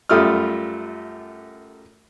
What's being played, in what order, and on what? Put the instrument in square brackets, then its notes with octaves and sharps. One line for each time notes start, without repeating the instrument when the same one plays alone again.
[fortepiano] F#2 G3 A3 F4 D#6 F6